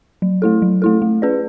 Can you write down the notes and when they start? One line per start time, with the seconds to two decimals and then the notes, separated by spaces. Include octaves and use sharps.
0.22 F#3
0.42 A3 E4 A4
0.62 F#3
0.82 A3 E4 A4
1.02 A3
1.22 C#4 G#4 B4 D5